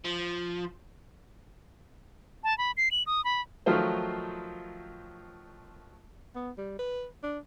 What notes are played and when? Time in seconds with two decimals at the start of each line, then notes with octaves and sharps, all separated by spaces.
0.05 F3
2.44 A5
2.58 B5
2.77 C7
2.91 F#7
3.07 D#6
3.25 B5
3.66 D#3 F3 F#3 A3 F4 C5
6.35 B3
6.58 G3
6.79 B4
7.23 D4